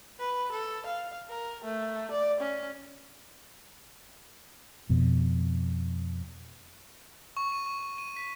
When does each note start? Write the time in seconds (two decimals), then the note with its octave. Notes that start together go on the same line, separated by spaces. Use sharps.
0.19 B4
0.52 A4
0.86 F5
1.29 A#4
1.64 A3
2.11 D5
2.41 C#4
4.90 F2 B2
7.37 C#6
7.52 D#7
7.66 C#6
7.98 D#7
8.16 B6